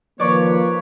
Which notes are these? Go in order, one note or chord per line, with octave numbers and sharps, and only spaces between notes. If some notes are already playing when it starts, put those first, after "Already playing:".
D#3 F3 A#3 B4 C#5 D5 C#6